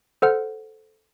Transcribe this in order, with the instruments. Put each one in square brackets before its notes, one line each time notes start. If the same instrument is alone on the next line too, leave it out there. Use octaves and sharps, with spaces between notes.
[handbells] A4 C5 F#5 F6